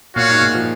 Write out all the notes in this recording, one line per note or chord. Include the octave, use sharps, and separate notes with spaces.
A#2 F#4 C#5 F5
G#2
A#2
F3